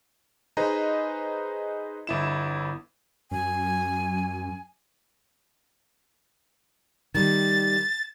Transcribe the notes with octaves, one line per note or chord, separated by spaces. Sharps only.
D#4 G#4 B4 C5 D#5 A#5
G1 E4 E7
F#2 G#5
D#3 G3 A6